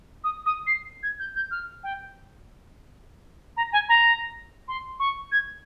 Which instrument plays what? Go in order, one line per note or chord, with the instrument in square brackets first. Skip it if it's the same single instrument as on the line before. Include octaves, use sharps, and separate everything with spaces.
[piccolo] D#6
D#6
C7
G#6
G6
G6
F6
G5
A#5
G#5
A#5
C6
C#6
G#6